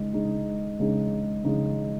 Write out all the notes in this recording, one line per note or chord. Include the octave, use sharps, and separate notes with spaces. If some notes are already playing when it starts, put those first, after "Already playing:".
Already playing: C#3 G#3 D#4
C#3 G#3 D#4 G#4
C#3 G#3 D#4 G#4
C#3 G#3 D#4 G#4